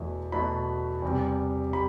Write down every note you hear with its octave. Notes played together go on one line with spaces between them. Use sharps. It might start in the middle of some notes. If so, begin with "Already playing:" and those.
Already playing: E2 B2 F#3 A3 E4
E2 B2 F#3 A3 E4 B5
E2 C3 G3
G3 B5